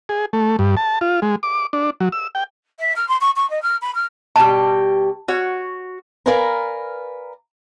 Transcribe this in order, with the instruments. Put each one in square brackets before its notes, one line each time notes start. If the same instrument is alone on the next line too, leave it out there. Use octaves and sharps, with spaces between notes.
[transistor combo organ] G#4
A3
G2
A5
F4
G#3
D6
D4
F#3
E6
G5
[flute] E5
F6
C6
C#6
C#6
D#5
F6
B5
F6
[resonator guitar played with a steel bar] B2 G3 G4 [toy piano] A5
[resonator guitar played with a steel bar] F#4 C#5
[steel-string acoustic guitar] A#4 B4 D5 F5 G#5 A#5